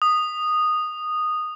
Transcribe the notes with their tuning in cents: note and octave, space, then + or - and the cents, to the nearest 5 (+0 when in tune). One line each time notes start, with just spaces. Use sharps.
D#6 -10